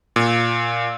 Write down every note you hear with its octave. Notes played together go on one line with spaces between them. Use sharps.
A#2